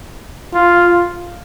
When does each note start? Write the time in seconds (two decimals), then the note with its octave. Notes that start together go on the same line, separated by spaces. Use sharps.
0.54 F4